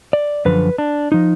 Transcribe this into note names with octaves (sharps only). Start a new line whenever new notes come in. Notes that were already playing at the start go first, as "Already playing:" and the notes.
D5
F#2 D3 F3 B4
D4
F3 D#4